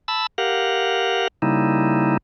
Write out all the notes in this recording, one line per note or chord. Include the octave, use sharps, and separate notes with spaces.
A5 B5 E6
G4 A#4 F5 F#5
C#3 G3 A#3 D#4 E4